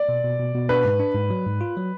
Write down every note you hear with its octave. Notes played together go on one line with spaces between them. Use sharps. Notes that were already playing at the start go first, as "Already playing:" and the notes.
Already playing: D5
B2
B2
B2
B2
D4 B4
G#2
D4
G#2
F#3
G#2
F4
F#3